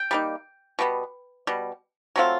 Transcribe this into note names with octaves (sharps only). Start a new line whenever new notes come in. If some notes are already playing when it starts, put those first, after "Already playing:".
Already playing: G5
G3 A#3 D#4
B2 G3 B3
B2 G3
F#3 A3 C4 F4